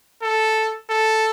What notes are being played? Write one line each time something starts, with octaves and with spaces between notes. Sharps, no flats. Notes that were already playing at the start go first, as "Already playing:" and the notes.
A4
A4